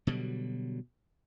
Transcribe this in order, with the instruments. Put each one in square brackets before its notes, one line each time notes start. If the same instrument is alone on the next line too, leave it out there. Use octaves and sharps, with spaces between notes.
[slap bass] B2 D3 F#3 G3